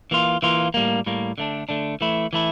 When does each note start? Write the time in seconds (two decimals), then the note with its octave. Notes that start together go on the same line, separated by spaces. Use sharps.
0.11 E3 A#3 F4
0.43 E3 A#3 F4
0.74 A2 G3 A#3
1.06 A2 G3 A#3
1.38 D3 A3 D4
1.69 D3 A3 D4
2.01 E3 A3 E4
2.33 E3 A3 E4